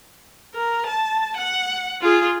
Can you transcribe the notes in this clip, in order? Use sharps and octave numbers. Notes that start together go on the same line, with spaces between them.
A#4
A5
F#5
F4 G#4